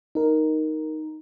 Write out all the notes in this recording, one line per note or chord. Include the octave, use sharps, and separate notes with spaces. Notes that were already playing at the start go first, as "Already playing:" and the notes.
D#4 A#4